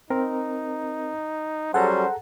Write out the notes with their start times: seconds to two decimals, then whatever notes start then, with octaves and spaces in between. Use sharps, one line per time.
0.10 C4 D#4 A#4
1.74 F#3 G3 C#4 G#4 A4 C5 F#5 A#5